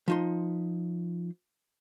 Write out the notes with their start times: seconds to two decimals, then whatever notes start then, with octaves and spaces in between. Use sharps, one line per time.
0.08 F3 D#4 C6